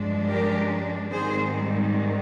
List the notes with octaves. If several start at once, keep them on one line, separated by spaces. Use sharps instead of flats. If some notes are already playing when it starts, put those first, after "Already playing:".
Already playing: G2 F3 G#3 D4
G4 A#4
G#2 D#3 G3 C4 G#4 C5